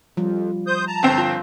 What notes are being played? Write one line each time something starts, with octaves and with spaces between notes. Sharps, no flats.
F2 F3 G3
C5 D#6 G6
A5 A#5
G1 C4
F4